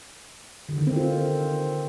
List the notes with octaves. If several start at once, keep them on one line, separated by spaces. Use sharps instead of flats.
D3
D#3
C4
F4